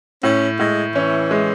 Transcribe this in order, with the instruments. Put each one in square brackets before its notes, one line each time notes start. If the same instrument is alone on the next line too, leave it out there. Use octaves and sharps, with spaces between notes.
[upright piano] A2 [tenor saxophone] C#4
[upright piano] A2 [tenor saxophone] G#3
[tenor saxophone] E3 [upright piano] C#4
[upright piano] G#3